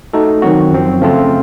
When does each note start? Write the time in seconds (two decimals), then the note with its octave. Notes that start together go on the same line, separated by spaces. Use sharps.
0.13 A3 D#4 F#4 A4
0.42 D#3 F#3 C4 F#4
0.72 F#2 F3 C4
1.01 C#3 F3 A3 C4 F4